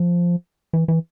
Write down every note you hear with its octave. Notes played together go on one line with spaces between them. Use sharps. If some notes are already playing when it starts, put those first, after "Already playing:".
Already playing: F3
E3
E3